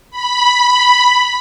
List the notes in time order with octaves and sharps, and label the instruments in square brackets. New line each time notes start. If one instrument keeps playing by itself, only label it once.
[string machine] B5